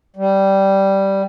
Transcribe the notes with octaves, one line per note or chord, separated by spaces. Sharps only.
G3